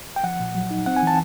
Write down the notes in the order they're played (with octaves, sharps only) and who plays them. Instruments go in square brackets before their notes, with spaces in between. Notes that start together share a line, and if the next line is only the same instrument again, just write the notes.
[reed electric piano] G5
F3 F#5
A#2
F#3
D#4
C4 F#5
G#5
E3 A5